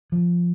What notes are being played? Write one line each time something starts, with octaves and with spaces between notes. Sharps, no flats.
F3